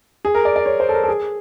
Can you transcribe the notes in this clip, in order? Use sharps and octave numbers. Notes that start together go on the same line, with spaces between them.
G#4
A#4
D5
D5
C#5
C5
A4
A#4
A4
G#4